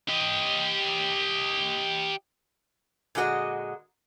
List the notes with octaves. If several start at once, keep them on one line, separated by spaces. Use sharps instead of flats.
G4 D#5
A#2 D3 G#3 F#4 D#5